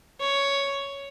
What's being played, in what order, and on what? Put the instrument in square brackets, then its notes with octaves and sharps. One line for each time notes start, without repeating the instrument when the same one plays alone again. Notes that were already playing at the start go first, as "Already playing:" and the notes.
[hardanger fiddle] C#5